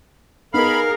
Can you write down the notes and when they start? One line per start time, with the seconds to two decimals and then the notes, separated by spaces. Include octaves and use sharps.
0.54 B3 D#4 G#4 A#4 F5 B5